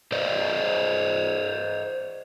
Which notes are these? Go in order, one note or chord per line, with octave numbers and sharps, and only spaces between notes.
C5 D5 D#5